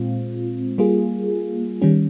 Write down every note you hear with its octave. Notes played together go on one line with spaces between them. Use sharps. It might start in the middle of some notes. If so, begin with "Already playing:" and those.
Already playing: A#2 G#3 C4 F4
G3 A#3 F4 G#4
D#3 G3 C#4